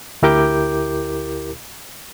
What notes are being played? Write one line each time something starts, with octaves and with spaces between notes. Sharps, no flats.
D2 E4 G4 A#4 D6 G6